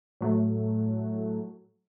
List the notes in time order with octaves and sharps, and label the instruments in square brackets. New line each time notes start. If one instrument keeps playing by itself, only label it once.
[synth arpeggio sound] A2 F#3 A3